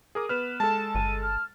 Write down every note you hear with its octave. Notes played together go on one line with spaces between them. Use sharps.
G#4 A#4 D6 D#6
B3 B4 F6 E7
G#3 A4 A5
G1 D#7
F6